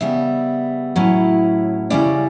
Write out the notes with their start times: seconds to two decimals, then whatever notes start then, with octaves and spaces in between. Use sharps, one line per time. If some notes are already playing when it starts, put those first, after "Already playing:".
0.01 C#3 G3 B3 E5
0.96 A2 F#3 C#4 E4
1.90 C#3 G3 C#4 E4 D5